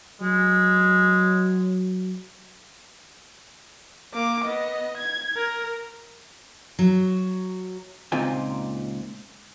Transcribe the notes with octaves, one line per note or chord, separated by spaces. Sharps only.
F#3 G#3
A#3 D6
B3 D#5
G#6
A#4
F#3
C#2 A#2 C4 D#4 F4 G#5